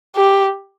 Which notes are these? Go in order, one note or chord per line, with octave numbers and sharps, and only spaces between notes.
G4